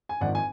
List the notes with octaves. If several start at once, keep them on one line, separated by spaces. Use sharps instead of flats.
G#5
G#1 G#2 F3 D5 F#5
G#5